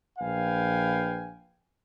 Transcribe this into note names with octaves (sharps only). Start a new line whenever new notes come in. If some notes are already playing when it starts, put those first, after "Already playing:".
A#1 B4 F5 G5 G#5